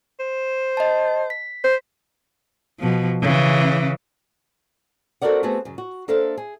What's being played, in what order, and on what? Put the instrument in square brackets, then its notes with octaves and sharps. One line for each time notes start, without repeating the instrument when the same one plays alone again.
[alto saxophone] C5
[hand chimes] D#5 A5
B6
[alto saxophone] C5
[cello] B2 F3
C#3 E3
[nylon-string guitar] C4 F#4 A4 A#4 D5 F#5
A3 B3 C4 F#4 G#4
F#2 C#3
F#4
A#3 D4 A4 C5 E5 F5
G#4